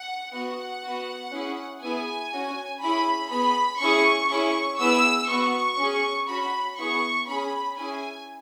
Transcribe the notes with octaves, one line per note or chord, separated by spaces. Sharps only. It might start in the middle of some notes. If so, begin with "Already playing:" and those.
Already playing: F#5
B3 F#4 F#5
B3 F#4
C#4 E4 G#4
B3 E4 G#4 G#5
C#4 F#4
C#4 E4 G#4 B5
B3 G#4 B5
C#4 E4 G#4 C#6
C#4 E4 G#4 C#6
B3 E4 G#4 E6
B3 F#4 C#6
C#4 G#4
C#4 F#4 B5
B3 E4 G#4 C#6
C#4 G#4 B5
C#4 E4 G#4 G#5